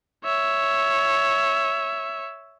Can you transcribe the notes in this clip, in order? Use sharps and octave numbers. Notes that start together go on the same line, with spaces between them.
C#5 E5